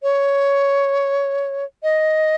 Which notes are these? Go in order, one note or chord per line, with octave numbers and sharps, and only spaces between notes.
C#5
D#5